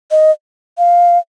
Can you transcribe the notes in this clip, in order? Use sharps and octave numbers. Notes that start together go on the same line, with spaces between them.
D#5
F5